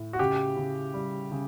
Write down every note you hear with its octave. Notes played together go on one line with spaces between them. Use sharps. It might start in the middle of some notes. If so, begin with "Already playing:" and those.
Already playing: A2
F#4
C#3 G4
C#3
G3
C#3